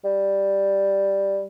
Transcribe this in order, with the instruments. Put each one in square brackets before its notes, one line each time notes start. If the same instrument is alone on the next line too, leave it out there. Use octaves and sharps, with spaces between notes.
[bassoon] G3